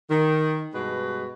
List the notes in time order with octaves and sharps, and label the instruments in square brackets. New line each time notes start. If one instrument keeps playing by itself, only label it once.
[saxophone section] D#3
G2 B2 G#3 B4